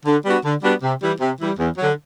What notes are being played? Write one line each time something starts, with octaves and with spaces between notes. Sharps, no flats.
D3
G3 B3 D4 F#4
D3
G3 B3 D4 F#4
C3
E3 G3
C3
E3 G3
E2
D3 F#3